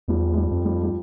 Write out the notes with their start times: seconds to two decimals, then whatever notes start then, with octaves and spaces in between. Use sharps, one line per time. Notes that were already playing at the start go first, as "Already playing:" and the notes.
0.08 E2 F3 G3
0.32 G#3
0.37 F3 G3
0.51 F2
0.65 F3 G3
0.83 G3